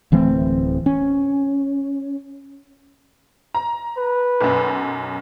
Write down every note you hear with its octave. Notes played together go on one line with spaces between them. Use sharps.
D1 E3 A3 C4
C#4
A#5
B4
B1 F#2